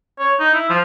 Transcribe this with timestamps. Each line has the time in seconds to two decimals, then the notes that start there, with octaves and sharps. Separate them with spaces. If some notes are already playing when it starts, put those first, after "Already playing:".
0.19 C#5
0.40 D#4
0.54 E4
0.70 F3